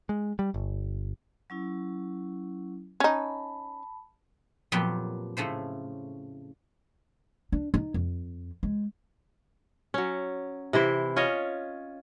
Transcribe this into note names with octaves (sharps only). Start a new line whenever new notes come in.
G#3
G3
G1
F#3 C#4 E4
C#4 D#4 A5 B5
F2 A#2 F#3 B3 G4 G5
A2 C#3 A3 C5
D4
D#4
F2
G#3
F#3 C#4
C3 E3 E4 C5
C#4 F4 C#5 D#5